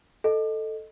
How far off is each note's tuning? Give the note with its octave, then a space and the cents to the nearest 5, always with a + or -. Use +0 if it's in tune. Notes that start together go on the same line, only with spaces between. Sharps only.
A4 +0 D#5 -5